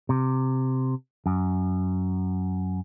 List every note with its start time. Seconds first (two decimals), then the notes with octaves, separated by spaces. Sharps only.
0.09 C3
1.26 F#2